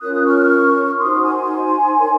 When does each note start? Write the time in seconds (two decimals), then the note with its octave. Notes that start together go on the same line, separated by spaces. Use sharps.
0.01 C#4 F4 A#4 C#5 D#6 F#6
0.14 F#6
0.26 C#6 F6
0.99 D#4 F#4 C5 C6 D#6
1.23 G#5 C6
1.96 D#4 A#4 C#5